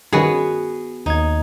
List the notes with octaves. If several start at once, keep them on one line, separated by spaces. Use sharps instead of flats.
G2 D#3 B3 C#4 F#4 G#4 B4
D#2 D#4 G#6